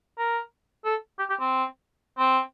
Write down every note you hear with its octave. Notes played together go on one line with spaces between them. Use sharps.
A#4
A4
G4
G4
C4
C4